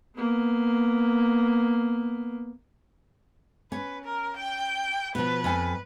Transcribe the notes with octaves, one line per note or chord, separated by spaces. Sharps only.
A#3 B3
C#4 B4
A#4
G5
B2 F3 B4
F2 G#5